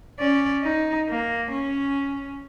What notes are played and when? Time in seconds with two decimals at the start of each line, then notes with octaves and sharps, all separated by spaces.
0.19 C#4 D5
0.62 D#4
1.08 A#3
1.51 C#4